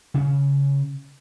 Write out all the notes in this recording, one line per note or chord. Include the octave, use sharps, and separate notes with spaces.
C#3 C#4